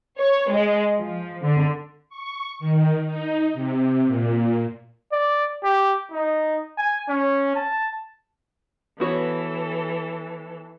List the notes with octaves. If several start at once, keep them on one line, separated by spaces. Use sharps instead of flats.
C#5
G#3
F3
D3
C#6
D#3
D#4
C3
A#2
D5
G4
D#4
G#5
C#4
A5
E3 B3 F#4 A4 C#5